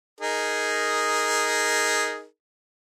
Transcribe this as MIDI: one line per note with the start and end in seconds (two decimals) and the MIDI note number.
0.21 2.25 63
0.21 2.25 68
0.21 2.25 70